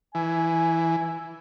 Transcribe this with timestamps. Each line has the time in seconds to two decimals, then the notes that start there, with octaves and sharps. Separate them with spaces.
0.15 E3 G#5